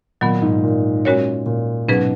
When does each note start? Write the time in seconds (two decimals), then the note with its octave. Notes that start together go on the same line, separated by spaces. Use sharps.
0.21 A#2 D#3 F#3 B3
0.42 G#2
0.63 A#2
1.05 G#3 C#4 F#4 A#4 C#5
1.46 A#2
1.88 G#2 B2 F#3 C#4 G#4 B4